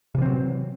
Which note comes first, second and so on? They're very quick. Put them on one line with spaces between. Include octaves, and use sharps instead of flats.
C3 E3 C4 F#3